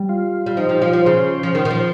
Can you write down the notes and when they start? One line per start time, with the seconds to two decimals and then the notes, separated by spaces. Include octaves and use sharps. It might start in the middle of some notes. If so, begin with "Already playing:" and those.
Already playing: G3
0.09 F4
0.46 G3
0.57 F3 D#4
0.69 F3 G4
0.82 F3 F4
0.93 F3
1.06 C#3 C5
1.43 F3
1.55 D#3
1.65 D#3
1.70 F3